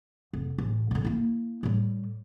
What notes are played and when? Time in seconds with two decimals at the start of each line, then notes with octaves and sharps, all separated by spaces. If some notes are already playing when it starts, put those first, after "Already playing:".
0.33 F1
0.58 A1
0.91 A#2 D3
1.05 A#3 E4
1.63 A2 G3